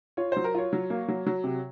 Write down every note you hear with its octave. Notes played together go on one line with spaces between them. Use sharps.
F4 C#5
F#3 C5
A#4
F4 C#5
F#3
A#3
F#3
F#3
C3